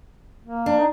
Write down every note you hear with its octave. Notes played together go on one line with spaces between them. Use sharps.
A#3
D4
D#4